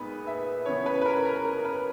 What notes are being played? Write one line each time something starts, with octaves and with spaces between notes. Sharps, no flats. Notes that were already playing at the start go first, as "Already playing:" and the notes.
Already playing: A#2 G#3 B3 D#4 B4
E5
C#3 E3 B3 C#5
B4
B4
A#4
A#4
A#4
B4